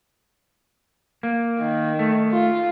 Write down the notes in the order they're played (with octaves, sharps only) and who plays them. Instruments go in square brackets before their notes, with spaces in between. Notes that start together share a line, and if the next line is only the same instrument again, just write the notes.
[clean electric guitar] A#3
[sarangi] D#3
[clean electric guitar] A3
[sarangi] F4